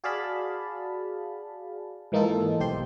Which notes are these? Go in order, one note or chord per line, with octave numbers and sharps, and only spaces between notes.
F#4 G#4 D5 F5 A5 B5
G#2 E3 A#3 D#4 F4 A4
B1 G4 C5 C6